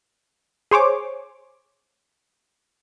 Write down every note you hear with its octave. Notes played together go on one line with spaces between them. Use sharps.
G#4 C5 C#5 D6